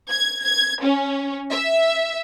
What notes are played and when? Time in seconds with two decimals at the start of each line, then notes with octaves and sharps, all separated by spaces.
0.10 G#6
0.43 G#6
0.82 C#4
1.52 E5